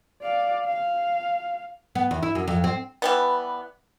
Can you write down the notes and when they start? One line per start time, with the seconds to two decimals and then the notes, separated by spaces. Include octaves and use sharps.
0.22 D5 F5
0.65 F5
1.95 B3
2.11 E2
2.23 E4
2.35 F#2
2.48 F2
2.64 C4
3.02 E3 G3 B3